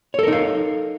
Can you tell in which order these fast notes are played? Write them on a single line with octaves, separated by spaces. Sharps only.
C#5 A4 A#4 D#4 F5